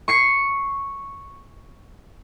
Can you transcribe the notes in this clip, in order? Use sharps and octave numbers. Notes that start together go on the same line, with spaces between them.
C#6 C7 C#7